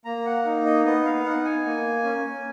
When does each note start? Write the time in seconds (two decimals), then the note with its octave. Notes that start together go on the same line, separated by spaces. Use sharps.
0.05 A#3 A#5
0.26 F#5
0.45 D#4
0.66 D#5
0.85 B3 D#5
1.05 F5
1.25 D#4 F#5
1.45 G#5
1.65 A#3
2.04 C#4